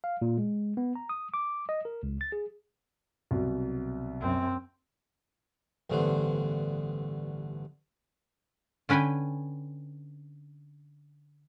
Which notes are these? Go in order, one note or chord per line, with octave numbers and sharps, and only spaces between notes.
F5
A#2
G#3
B3
A#5
D#6
D6
D#5
A#4
C#2
A6
G#4
C2 B2 F#3
F#2 C4
A1 G2 D3 A3 B3 C5
D3 C#4 B4 G5 G#5